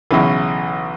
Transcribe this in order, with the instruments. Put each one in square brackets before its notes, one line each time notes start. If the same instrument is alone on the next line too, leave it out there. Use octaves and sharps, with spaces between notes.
[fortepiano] B1 C#3 E3